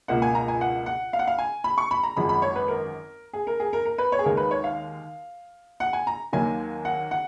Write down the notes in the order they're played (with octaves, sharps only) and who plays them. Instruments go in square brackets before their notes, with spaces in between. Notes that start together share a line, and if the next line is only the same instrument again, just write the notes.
[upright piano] C#2 B2 A#3 F#5
G#5
A#5
G#5
F#5
F#5
F5
F#5
F5
G#5
B5
C#6
B5
A#5
G#1 F#2 F3 G#3 B5
B5
C#5
B4
A#4
G#4
A#4
G#4
A#4
A#4
B4
C#5
G#4
D#2 D#3 G#3 A#4
B4
C#5
F5
F#5
G#5
A#5
D#2 D#3 F#3 A#3 G#5
F#5
F#5